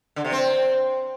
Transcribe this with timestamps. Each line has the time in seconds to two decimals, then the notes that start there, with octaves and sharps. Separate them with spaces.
0.16 D3
0.24 C3
0.32 C4